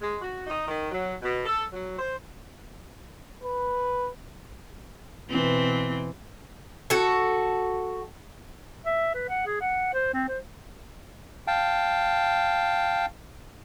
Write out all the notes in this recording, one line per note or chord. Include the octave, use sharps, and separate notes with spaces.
G#3
F#4
D#4
D#3
F#3
B2
A4
F#3
C5
B4
B2 E3 C4
F#4 A4
E5
B4
F#5
G#4
F#5
C5
C4
C5
F5 G5 A5